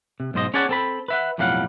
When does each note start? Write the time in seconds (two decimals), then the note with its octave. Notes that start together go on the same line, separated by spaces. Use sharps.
0.20 C3
0.34 B1 G#2 C5 D#5
0.54 C#4 G#4 C#5 D5 F#5 A5
0.69 C4 A4 B5
1.08 B4 E5 F#5
1.38 B1 F2 A2 G3 F5 F#5